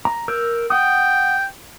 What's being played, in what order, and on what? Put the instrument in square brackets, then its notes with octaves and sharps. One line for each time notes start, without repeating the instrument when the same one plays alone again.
[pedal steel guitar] A#5
A#4 E6 G6
[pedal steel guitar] F#5 D#6 [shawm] G5